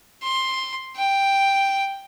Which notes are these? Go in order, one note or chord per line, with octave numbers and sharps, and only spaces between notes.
C6
G5